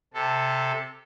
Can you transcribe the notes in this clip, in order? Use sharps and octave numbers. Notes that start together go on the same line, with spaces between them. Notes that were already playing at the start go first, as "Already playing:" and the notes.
C3 A4